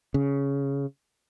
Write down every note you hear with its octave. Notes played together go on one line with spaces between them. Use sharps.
C#3